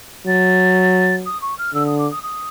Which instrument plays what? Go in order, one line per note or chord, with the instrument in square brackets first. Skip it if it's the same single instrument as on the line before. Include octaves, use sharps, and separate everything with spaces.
[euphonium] F#3 [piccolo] A6
[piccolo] D#6
C#6
F6
[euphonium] D3 [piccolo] E6
[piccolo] D#6
D6
D#6
D#6